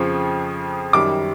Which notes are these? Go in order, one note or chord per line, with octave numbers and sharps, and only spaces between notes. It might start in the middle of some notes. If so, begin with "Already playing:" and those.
Already playing: F2 C#3 F3 C#6
F#2 D#3 G3 D6